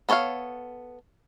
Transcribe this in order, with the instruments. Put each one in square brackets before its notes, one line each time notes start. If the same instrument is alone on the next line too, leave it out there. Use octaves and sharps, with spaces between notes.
[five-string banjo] B3 A4 C#5 E5 F5